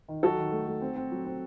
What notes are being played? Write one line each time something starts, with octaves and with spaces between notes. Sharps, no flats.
D#3
F#3 F#4 A4
D#3
A3
A3
C4
C4
F#3
C4